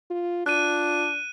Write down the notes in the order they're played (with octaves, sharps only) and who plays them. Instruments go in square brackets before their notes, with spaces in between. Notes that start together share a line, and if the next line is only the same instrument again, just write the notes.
[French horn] F4
[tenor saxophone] D4 [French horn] F4 [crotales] F#6 D#7